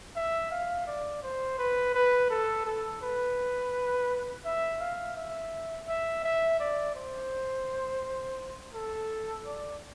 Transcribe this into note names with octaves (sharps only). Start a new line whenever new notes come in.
E5
F5
D5
C5
B4
B4
A4
A4
B4
E5
F5
E5
E5
E5
D5
C5
A4
D5